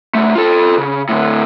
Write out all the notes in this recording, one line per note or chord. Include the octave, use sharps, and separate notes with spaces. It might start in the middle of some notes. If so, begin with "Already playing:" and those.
C#2 A3
F4 A4
C#3
A2 D3